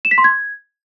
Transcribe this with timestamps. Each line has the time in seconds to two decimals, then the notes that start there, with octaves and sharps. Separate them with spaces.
0.05 E7
0.11 B6
0.18 C6
0.24 G#6